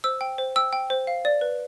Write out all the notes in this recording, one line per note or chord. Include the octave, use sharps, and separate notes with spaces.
C5 E6
G5
C5
G5 E6
G5
C5
F5
D5
B4